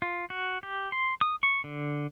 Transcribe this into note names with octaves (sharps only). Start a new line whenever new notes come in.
F4
F#4
G4
C6
D#6
C#6
D3